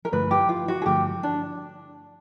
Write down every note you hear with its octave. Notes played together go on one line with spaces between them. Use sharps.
A#4
G2 D3 F3 A3 B4
G4
F4
F#4
G#4
G2 D3 F3 A3 G4
D4